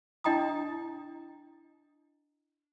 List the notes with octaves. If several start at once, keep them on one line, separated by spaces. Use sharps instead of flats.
D4 E4 D#5 G5 A#5 D#6